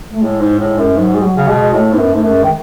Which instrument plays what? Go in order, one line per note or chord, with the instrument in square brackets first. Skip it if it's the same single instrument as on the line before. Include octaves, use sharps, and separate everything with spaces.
[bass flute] A3
[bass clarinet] A2 [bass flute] G#3
[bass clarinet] G#2
A2
F#2
[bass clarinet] G#2 [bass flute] F#3
[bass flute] G#3
F#3
[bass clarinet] C#3
[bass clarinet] B2 [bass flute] G#3
[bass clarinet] A2 [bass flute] A3
[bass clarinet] G#2 [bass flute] B3
[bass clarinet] F#2
[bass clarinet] G#2 [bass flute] A3
[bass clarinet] F#2
[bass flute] G#3
[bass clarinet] D#3